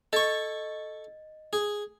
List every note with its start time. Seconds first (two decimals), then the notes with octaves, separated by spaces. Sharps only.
0.13 A4 D#5 C#6 A6
1.53 G#4